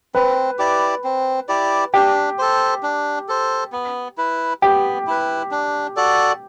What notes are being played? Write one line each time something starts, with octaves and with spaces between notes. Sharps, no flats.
C4 B4
E4 G4 D5
C4
E4 G4 D5
D4 G4
A4 C5
D4
A4 C5
B3
E4 B4
B3 G4
E4 B4
D4
F#4 A4 D5